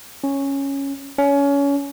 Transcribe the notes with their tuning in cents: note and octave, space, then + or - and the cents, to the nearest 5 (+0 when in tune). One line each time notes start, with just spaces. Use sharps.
C#4 -5
C#4 +25